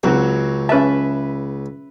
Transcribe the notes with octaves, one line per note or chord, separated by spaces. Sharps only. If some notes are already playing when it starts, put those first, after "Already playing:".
C#2 F#3 C4 F#4
C#4 B4 E5 A5